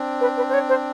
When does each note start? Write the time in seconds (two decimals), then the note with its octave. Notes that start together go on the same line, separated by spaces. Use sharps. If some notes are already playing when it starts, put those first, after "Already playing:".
Already playing: C4 D4
0.21 B4
0.37 B4
0.49 C5
0.54 C#5
0.69 C5